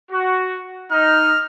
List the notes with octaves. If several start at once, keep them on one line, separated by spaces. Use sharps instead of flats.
F#4
D#4 F6